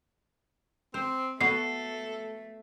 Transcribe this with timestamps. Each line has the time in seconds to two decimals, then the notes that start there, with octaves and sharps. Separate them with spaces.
0.94 C4 C5
1.41 A3 B3 F#4 A4 C7